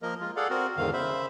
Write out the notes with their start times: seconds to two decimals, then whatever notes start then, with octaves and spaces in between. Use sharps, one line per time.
0.02 F3 A#3 A#4 D#5
0.21 G#3 F4
0.36 G#4 A4 D5 F5 F#5
0.50 C4 F#4 A#4
0.77 E2 G#2 D3 D#3 F5
0.93 C#3 C5 E5 B5